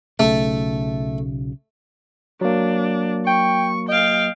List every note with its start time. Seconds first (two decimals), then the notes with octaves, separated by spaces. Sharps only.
0.20 B1 C#3 A3
2.41 F#3 A#3 D4
3.27 G5 C#6
3.89 D#5 F5 G5